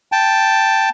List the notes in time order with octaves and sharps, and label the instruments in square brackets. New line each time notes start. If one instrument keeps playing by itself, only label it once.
[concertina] G5 A5